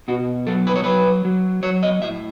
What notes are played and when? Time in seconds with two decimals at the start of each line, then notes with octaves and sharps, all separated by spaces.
0.08 B2 F#4
0.47 F#3 A4
0.67 B4
0.76 C#5
0.84 F#3 B4
1.25 F#3
1.63 F#3 C#5
1.83 D#5
2.02 A2 E5